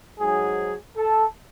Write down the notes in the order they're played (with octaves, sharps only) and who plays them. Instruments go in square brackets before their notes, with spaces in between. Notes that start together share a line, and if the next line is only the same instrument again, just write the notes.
[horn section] G#2 F#3 G#4
A4